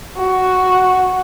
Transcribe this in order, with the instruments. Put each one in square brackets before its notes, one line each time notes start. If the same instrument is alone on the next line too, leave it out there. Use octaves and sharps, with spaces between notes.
[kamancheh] F#4